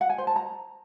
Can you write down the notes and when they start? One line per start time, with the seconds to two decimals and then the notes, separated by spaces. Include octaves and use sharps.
0.01 F#5
0.10 G#5
0.18 C5
0.27 A5
0.36 A#5